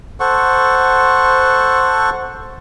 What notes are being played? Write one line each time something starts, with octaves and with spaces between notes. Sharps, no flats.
A4 C5 F#5 C#6